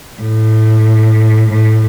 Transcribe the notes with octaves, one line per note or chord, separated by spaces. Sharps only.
A2
A2